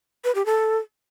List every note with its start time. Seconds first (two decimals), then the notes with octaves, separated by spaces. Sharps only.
0.24 B4
0.35 G4
0.46 A4